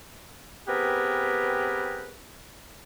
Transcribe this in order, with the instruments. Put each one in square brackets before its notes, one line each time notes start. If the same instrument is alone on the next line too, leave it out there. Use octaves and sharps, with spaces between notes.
[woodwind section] B3 C4 G4 G#4 A#4 B4